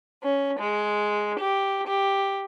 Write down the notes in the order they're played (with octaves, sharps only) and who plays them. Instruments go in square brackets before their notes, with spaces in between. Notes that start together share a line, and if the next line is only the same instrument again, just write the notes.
[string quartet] C#4
G#3
G4
G4